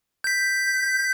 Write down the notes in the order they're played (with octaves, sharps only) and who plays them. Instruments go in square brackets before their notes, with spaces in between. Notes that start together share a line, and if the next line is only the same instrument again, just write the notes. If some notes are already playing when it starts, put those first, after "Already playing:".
[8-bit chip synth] G6 B6